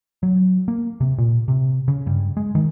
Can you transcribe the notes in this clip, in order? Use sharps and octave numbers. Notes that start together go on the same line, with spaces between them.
F#3
A#3
C3
A#2
C3
C#3
G2
G#3
D#3